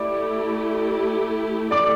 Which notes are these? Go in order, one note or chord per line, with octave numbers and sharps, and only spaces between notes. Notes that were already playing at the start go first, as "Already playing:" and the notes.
Already playing: A3 E4 G4 D5 D6
D5 D6